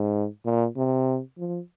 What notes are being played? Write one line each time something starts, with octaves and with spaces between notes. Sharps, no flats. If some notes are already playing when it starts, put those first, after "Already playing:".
Already playing: G#2
A#2
C3
F3